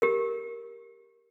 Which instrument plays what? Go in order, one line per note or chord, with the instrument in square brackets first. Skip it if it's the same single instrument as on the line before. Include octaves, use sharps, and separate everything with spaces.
[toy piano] G4 A#4